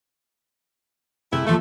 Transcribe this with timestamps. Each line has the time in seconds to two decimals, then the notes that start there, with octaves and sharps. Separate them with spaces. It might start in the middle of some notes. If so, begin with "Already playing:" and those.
1.33 C3 G#3 A3 E4
1.47 D#2 F3 A3